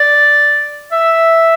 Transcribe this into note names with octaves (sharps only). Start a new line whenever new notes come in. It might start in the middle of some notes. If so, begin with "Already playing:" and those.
Already playing: D5
E5